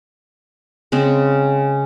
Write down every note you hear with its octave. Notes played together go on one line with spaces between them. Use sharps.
C#3 G#3 C4